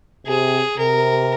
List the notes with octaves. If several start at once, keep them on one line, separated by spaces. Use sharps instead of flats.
C3 G#4
C3 A#4